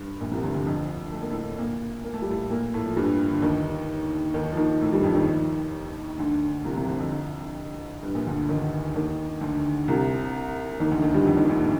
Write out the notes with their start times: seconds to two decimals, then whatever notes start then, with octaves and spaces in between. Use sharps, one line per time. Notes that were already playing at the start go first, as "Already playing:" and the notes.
Already playing: G2
0.20 A#1 A#2
0.31 C2 C3
0.43 D2 D3
0.50 C3
0.54 D2 D3
0.66 F2 F3
1.12 A3
1.22 A#3
1.30 A2 A3
1.58 A#2 A#3
2.04 A#3
2.14 A3
2.22 G3
2.30 A2 A3
2.50 A#2 A#3
2.74 A2 A3
2.86 F3
2.96 G2 G3
3.32 D3
3.42 D#2 D#3
4.34 D#2 D#3
4.52 F3
4.57 D#2 D#3
4.81 A2 A3
4.92 G2 G3
5.04 F2 F3
5.15 D#2 D#3
6.18 D2 D3
6.64 C2 C3
6.76 C2 C3
6.87 D2 D3
6.99 F2
8.03 G2
8.14 A#1 A#2
8.27 D2 D3
8.49 D#2 D#3
8.96 D#2 D#3
9.41 D2 D3
9.88 C2 C3
10.80 D#2 D#3
10.91 D2 D3
11.02 D#2 D#3
11.14 G2 G3
11.26 F2 F3
11.37 D#2 D#3
11.48 D2 D3
11.57 A2
11.61 A#2